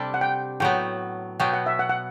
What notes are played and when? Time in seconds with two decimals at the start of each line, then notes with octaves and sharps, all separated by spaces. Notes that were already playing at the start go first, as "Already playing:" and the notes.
Already playing: C3 G3 D4 A4
0.14 F#5
0.21 G5
0.60 A2 F#3 B3 G5
1.40 B2 F#3 B3 G5
1.53 F#5
1.66 E5
1.79 F#5
1.89 F#5